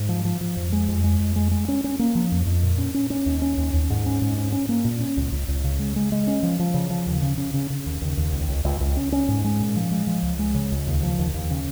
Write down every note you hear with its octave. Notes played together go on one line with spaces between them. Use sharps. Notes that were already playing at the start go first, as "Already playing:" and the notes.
Already playing: G#2
F3
F3
F3
F2
G#3
F2
G#3
F2
G#3
G#3
C#4
C#4
A#3
F3
F2
F2
A#2
C#4
C#4
C#4
D#2
C#4
D#2
D#2
G#2
C#4
G#2
C#4
C#4
A#3
A#2
C#4
C#2
C#2
C#2
C#3
G#3
G#3
G#3
C#4
F3
F3
C#3
F3
D#2
C#3
C#3
C#3
C#3
D#2
D#2
D#2
C#2
C#2
C#2
C#2
C#4
C#4
G#2
G#3
A#2
F3
G#3
F3
C#2
G#3
C#3
C#2
D#2
F3
D#2
D#2
C#3